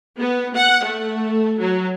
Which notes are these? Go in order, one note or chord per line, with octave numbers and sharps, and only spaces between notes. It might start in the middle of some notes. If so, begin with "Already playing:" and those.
B3
F#5
A3
F#3